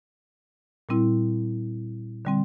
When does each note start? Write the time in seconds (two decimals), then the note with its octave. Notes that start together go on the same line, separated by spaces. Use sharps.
0.89 A#2 G3 C4 E4
2.25 D3 G3 C4